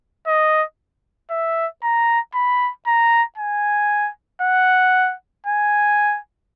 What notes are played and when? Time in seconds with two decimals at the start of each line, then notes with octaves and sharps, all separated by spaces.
0.27 D#5
1.31 E5
1.84 A#5
2.35 B5
2.87 A#5
3.38 G#5
4.42 F#5
5.46 G#5